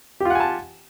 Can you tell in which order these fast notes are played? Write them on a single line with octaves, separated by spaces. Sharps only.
G4 F4 F#5 G#5 A5